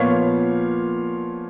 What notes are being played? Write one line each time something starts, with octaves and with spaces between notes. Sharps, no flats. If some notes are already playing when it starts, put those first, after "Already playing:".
Already playing: A#2 F3 B3 C#5 F5